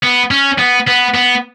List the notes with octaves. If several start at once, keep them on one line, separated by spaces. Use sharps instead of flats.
B3
C#4
B3
B3
B3